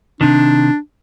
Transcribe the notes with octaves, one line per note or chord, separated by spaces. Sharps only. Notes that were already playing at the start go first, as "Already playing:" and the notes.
C3 D#3 D4